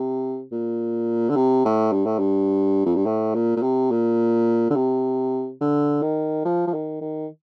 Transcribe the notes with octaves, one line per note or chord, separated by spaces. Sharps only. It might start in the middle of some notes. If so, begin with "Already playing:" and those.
Already playing: C3
A#2
D3
C3
A2
G2
A2
G2
F2
G2
A2
A#2
A#2
C3
A#2
D3
C3
D3
D#3
F3
F3
D#3
D#3